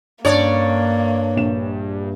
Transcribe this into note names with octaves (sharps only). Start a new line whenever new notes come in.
G2 A#3 C#4 D4 C#5 D5
A#1 E7